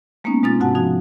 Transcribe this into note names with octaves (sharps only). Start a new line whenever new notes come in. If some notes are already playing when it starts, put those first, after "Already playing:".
G#3 A#3 B3 C#4 D#4
B2 G#3 C4 D#4 F4 A6
G#2 C3 F#4 F#5 A5
F3 D#4 F#4